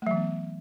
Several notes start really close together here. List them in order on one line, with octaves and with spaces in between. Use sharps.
A3 F#3 E3 B3